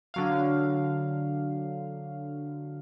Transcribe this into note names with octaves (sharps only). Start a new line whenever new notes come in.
D3 F#3 F5